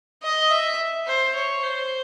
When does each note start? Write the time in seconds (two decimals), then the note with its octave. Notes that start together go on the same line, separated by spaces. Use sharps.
0.23 D#5
0.50 E5
1.07 C5
1.35 C#5
1.62 C5